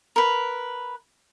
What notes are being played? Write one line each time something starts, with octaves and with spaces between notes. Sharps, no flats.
A#4 B4